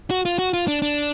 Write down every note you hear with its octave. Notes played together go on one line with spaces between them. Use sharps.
F#4
F4
F#4
F4
D4
D4